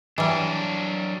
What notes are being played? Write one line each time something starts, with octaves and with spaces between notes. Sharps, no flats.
E3 F#3 G3 D4